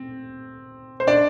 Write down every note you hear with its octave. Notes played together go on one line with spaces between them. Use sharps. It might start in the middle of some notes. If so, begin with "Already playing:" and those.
Already playing: C4
C5
D4 D5